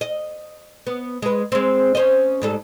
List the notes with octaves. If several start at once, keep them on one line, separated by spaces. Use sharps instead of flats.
D#5
B3
G#3 B4
G#3 C4
C#4 C5 D#5
G#2 G3 A4